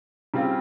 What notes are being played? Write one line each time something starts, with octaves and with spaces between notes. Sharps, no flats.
C#3 G3 C4 F4